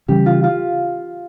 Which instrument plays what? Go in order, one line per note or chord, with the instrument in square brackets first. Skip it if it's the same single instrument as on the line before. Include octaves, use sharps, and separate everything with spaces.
[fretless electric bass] C#3 E3 G3 C#4 [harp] G4
[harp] F4
F4